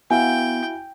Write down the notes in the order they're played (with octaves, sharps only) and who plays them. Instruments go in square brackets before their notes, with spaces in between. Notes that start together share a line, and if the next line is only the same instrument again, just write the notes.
[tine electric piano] B3 [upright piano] E4 F#4 F5 [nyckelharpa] G5 [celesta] G#5